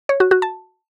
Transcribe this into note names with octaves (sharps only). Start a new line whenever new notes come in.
C#5
F#4
F#4
A5